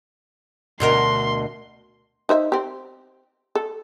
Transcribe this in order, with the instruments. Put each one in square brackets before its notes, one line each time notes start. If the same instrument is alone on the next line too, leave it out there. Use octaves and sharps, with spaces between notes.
[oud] D2 B2 A#4 [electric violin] C6
[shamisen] D#4 C5 E5
C4 G4
A4